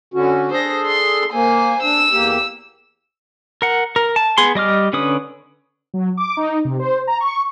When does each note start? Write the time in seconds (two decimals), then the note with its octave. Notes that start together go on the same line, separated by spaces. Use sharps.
0.14 D3 C#4 F#4
0.51 D4 G#4 A4 C5 A#6
0.87 C6
1.33 A#3 C5 G#5
1.83 D4 E6
2.12 E2 A#3 G4
3.62 A#4 F#5
3.96 A#4
4.16 A5
4.38 B3 G#4 C6
4.55 G3 D#5 D6 F6
4.93 D3 C#4 B4 D#6
5.94 F#3
6.17 D6
6.37 D#4
6.65 C3
6.79 C5
7.07 A#5
7.20 C#6